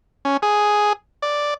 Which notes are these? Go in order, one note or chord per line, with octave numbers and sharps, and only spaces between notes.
C#4
G#4
D5